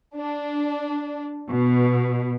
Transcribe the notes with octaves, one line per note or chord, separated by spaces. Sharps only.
D4
B2